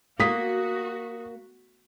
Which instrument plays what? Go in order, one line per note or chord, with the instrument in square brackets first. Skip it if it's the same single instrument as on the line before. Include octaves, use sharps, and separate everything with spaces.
[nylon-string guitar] A#3 [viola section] F#4 [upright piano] D#6 B6